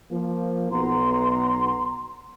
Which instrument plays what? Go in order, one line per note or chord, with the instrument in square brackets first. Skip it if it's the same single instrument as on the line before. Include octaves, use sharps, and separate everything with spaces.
[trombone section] F3 A#3
[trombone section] B1 B3 [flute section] A#5 C6